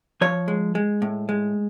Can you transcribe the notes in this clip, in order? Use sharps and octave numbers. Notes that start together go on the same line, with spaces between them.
F3 C#5
G#3
G#3
A2
G#3